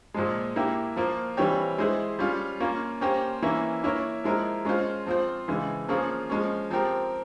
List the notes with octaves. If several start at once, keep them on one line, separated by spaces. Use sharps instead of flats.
A#2 F3 G#3
A#3 E4 G4
F3 A#3 F4
E3 G3 C4 G4 C#5
G#3 E4 G#4 C5
G3 C#4 F4
A#3 C#4 F4
A#3 C#4 G4 C5
E3 A#3 C#4 E4
A#3 E4 A#4 C#5
F3 G#3 E4 A#4
G#3 C#4 F4 C5
F3 C4 F4 C5
C#3 E3 G#3
F3 A#3 C#4 F4 G#4
F3 G#3 C#4
F3 C4 G4 A#4